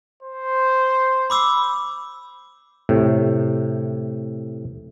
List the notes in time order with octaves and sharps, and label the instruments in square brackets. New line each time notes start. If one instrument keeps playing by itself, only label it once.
[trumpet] C5
[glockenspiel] B5 D6 E6
[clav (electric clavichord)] A2 C3